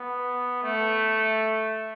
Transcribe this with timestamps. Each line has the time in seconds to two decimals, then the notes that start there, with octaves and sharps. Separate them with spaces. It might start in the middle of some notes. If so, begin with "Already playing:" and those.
Already playing: B3
0.64 A3